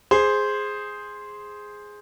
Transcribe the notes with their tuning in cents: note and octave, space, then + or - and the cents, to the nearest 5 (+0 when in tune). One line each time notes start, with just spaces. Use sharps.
G#4 +0 C5 +0